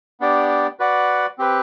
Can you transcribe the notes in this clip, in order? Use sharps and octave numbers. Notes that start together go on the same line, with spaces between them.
B3 D4 G4 D5
F#4 B4 D5 F#5
C4 G4 B4